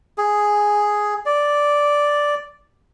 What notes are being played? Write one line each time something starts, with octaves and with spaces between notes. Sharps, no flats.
G#4
D5